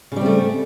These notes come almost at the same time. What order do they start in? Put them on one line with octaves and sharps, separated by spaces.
C#3 G3 C4 A3